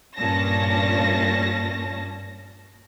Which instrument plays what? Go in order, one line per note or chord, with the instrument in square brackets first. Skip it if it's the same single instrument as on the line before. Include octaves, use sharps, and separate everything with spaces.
[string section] G2 A#2 C#4 A5 A#6